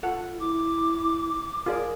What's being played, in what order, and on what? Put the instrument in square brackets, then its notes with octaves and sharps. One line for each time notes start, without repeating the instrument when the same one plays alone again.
[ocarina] F4 [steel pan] A4 F#5
[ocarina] E4 [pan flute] D6
[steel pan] F4 G#4 D5 [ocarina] A#4